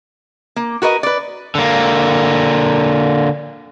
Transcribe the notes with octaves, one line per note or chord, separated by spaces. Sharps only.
A#3
F#4 A#4 B4 D#5
B4 D5
D3 A#3